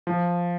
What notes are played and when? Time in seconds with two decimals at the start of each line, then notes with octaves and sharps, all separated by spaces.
0.07 F3